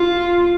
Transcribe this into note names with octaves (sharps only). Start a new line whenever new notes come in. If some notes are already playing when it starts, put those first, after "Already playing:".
Already playing: F4